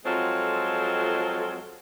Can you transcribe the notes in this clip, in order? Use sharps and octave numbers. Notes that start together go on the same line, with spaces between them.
F2 F#3 G#3 C4 F4 A4